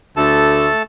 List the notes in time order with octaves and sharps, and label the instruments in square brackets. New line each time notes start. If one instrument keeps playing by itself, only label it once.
[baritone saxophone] D2 [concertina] A3 A4 A5